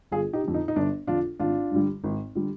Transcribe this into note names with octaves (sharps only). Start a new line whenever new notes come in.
G1 F4 G#4
D#4 G4
F2 D3
D#4
D#4
G1 D4
F2 D3 D4 F4
G#1 D4 F4
G2 D3 G3
G#1
D3 G3